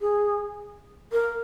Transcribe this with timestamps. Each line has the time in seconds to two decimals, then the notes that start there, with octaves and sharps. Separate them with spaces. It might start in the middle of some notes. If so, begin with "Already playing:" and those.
0.01 G#4
1.12 A#4